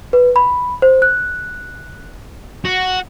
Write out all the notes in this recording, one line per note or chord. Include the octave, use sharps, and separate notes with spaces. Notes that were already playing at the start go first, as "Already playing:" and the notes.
B4
B5
C5
F#6
F#4